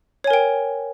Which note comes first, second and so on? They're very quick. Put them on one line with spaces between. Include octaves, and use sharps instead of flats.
C#5 G#5 A#4 G5